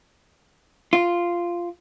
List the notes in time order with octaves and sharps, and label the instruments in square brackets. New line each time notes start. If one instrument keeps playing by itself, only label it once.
[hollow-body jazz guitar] F4